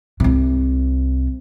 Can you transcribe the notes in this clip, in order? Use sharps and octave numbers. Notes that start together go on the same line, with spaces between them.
C2 C3